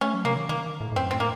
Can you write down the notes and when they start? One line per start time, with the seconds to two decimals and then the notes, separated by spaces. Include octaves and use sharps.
0.01 A3 C#4
0.14 F#3
0.25 C3 A#3
0.37 D#3
0.49 D#3 A#3
0.81 A2
0.92 A2
0.96 F#2 C4
1.11 A2 C4
1.20 A#3